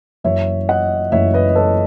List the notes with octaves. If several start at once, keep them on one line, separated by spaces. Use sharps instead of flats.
F#1 F#2 E3 C#5 E5
D#5 F#5
F#1 F#2 E3 C#5 E5
B4 D#5
D#5
A4 C#5